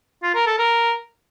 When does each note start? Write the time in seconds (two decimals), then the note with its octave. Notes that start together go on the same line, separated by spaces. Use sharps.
0.23 F4
0.35 A#4
0.47 A4
0.58 A#4